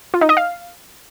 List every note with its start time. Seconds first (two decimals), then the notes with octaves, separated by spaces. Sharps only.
0.14 F4
0.21 D#4
0.29 D#5
0.37 F5